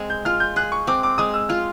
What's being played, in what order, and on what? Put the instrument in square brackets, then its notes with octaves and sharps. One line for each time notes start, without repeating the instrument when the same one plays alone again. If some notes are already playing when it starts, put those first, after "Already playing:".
Already playing: [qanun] G#3 C4
[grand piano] G6
[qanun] F4 [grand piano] F6
[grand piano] G6
[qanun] G#4 [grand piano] F#6
[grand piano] C#6
[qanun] C4 [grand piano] D6
[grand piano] D6
[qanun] G#3 [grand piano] D#6
[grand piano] E6
[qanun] F4 [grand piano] F6